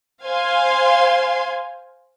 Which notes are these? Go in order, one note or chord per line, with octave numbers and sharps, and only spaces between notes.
C5 F5 G#5 C6